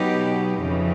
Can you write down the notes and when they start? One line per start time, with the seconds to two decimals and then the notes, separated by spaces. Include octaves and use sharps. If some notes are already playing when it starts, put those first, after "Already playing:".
Already playing: B2 F#3 B3 D#4 G4
0.61 F2 C#3 E3